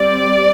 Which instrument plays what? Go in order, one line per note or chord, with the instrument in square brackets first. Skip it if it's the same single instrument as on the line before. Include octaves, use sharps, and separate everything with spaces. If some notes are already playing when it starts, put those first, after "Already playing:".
Already playing: [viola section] G3 C4 D5